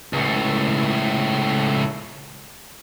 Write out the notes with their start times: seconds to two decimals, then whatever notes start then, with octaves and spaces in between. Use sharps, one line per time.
0.13 C#2 A2